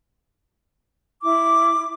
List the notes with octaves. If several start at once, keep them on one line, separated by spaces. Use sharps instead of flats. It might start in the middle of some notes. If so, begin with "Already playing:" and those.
E4 D6